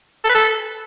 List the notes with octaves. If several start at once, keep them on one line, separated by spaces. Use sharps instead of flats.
A4
B4
A4